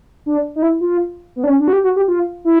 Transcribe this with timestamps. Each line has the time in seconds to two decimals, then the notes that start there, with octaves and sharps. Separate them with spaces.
0.26 D4
0.56 D#4
0.62 E4
0.81 F4
1.36 B3
1.44 D4
1.47 C#4
1.60 D4
1.68 F#4
1.73 G4
1.84 F#4
1.96 G4
2.08 F4
2.45 E4